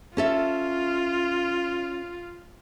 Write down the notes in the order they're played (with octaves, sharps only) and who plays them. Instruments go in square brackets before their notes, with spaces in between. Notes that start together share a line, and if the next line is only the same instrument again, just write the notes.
[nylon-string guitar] C#4 A4 E5 [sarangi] F4